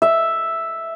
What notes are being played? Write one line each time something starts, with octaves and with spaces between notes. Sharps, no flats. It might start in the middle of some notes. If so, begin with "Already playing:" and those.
E5